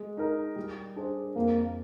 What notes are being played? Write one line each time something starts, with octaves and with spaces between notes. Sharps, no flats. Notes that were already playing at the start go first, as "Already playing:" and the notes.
Already playing: G#3
D#4 A#4
G3
D4 G#4 C5
F2 A#3